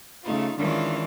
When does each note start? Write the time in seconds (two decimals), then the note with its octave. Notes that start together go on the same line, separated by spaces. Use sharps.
0.24 C#3 A3 D#4 F4
0.58 D#3 E3 G#3 C#4 D4 F4